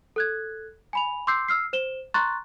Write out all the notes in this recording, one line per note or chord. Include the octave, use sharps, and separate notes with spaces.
A4 F#6 G#6
G#5 B5 F7
C6 D6 E6 G6 C7
E6 F6 C7
C5 E7 G7
A#5 C6 C#6 F#6 A6